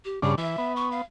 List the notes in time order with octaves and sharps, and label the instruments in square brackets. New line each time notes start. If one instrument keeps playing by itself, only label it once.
[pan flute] G4
[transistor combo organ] G2 C#3 D4 [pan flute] G#4
[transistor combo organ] E3 [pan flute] E5
[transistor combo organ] B3
[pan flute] C#6
F5